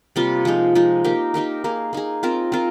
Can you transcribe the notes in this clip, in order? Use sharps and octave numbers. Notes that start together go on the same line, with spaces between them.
C3 G3 A#3 F4
F3 G#3 D#4
F3 G#3 D#4
A#3 D#4 G4 A#4
A#3 D#4 G4 A#4
A#3 D#4 G#4
A#3 D#4 G#4
C4 F4 A#4
C4 F4 A#4